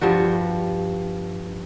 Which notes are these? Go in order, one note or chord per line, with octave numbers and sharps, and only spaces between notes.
G2 F3 G3 F#4